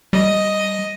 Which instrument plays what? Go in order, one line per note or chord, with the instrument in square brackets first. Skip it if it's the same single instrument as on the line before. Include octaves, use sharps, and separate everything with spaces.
[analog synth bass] G3 [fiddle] D#5